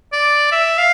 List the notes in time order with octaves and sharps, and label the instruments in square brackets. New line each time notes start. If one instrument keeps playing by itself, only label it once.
[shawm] D5
E5
F5